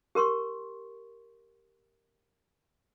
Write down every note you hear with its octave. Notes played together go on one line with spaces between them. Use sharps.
G4 A#4 C6 C#6